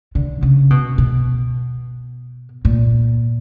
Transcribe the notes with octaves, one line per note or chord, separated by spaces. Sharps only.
D3
C#3
B2
B2
A#2